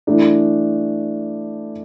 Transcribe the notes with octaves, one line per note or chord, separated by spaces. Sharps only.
E3 A3 D4